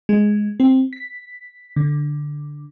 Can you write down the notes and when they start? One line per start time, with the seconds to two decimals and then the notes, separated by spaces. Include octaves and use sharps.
0.09 G#3
0.60 C4
0.93 B6
1.76 D3